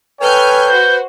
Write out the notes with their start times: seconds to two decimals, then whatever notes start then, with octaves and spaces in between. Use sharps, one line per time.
0.21 A4 B4 C#5 G5 G#5 F6 G6
0.69 F#4 C5 G6